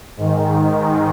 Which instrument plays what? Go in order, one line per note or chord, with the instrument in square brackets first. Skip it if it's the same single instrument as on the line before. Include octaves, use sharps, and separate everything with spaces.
[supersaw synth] G#2 D#3